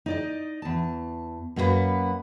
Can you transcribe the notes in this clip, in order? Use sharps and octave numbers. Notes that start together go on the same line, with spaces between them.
D#4 D5 D#5
E2 A5
F#2 A#3 D#4 F4 B4 F#5